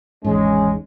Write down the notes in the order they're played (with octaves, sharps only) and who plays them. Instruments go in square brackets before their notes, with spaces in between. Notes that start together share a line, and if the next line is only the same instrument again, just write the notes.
[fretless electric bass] G#1 E2 G#2 [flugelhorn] G#3 [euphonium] C#4